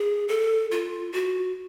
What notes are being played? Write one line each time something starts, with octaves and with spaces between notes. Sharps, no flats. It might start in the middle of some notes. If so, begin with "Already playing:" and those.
Already playing: G#4
A4
F4
F#4